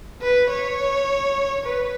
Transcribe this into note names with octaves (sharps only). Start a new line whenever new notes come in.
B4
C#5
B4